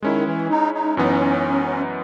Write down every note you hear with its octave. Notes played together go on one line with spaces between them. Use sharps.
D#3 G#3 C#4 E4
E3
D#4
D#4
F#2 E3 B3 C#4 D#4